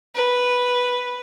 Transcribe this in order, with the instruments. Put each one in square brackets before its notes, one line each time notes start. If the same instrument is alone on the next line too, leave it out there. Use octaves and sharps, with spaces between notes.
[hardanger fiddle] B4